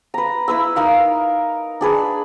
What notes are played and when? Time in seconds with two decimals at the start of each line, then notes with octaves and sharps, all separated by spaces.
0.14 B4 A#5
0.48 E4 B4 E6
0.76 D#4 A#4 F5
1.81 D4 G#4 B4